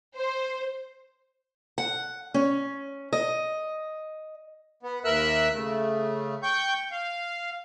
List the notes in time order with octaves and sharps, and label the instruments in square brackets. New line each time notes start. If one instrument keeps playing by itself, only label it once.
[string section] C5
[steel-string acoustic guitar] F#5
C#4
D#5
[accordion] B3
D#2 A#4 E5 E6 F#6
C#3 A3
G5 C#6 G6
F5